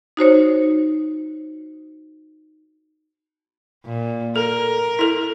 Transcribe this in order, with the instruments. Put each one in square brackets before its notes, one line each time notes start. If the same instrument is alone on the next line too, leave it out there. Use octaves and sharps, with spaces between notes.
[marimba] D#4 F#4 C5 C#5
[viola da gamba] A#2
[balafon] A4 [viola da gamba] A#4
[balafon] E4 A4